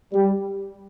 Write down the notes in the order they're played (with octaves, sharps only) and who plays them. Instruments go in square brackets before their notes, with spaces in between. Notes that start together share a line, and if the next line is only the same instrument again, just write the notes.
[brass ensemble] G3